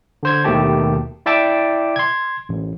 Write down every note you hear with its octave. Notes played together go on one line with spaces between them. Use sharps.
D3 C5 G#6
D#2 B2 D#3 A3 G4 A5
E4 D5 E5 G5 A5 D6
C6 G#6
A1